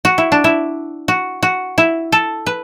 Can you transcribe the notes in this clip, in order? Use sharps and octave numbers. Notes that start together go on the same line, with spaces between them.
F#4
E4
D4
E4
F#4
F#4
E4
A4
B4